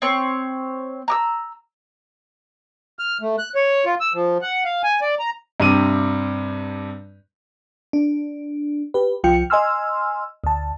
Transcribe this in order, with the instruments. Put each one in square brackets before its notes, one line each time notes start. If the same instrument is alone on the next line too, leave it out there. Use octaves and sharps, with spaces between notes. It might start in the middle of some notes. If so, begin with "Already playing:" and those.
[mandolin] C4 C#5
A#5 D6 E6
[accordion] F6
A3
F#6
C#5
F4
E6
F3
F#5
F5
G#5
D5
A#5
[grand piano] G2 C3 D#7
[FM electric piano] D4
G4 B4
C2 F3 F4 G5 C#7
D#5 G#5 C6 E6 F6
D2 A5